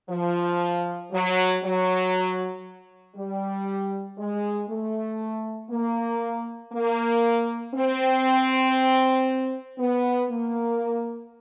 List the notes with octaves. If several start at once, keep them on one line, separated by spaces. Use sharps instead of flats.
F3
F#3
F#3
G3
G#3
A3
A#3
A#3
C4
B3
A#3